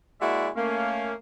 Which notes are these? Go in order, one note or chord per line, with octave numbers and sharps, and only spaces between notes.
G#3 A#3 E4 F#4 D5 E5
A3 A#3 C#4